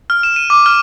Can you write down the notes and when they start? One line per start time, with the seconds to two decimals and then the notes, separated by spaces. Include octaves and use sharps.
0.10 F6
0.23 E7
0.36 D#7
0.50 D6
0.66 F6